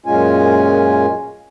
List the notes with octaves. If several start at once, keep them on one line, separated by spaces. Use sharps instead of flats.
F#2 A#2 G#3 C#4 F4 G#5